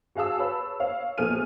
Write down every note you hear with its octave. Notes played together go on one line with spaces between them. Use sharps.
F#4 G#4 F5 A5 E6
B4 C#5 A5 B5
C#5 F5
A#1 B2 A4 G#5 F6 D#7